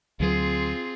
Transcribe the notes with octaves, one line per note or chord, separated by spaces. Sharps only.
D2 F#3 C4 F4 G#4